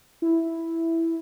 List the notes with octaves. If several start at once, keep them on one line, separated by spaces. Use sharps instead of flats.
E4